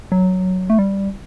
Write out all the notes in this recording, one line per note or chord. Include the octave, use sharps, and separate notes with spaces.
F#3
A3
G3